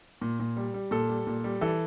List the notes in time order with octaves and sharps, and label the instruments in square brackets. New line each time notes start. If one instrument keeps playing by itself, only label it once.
[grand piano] A#2
A#2
G3
G3
A#2 A4
G3
A#2
G3
E3 A4